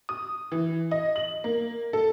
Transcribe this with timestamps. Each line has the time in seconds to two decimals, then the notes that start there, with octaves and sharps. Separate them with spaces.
0.09 D#6
0.52 E3
0.91 D#5
1.16 F#7
1.44 A#3
1.93 A4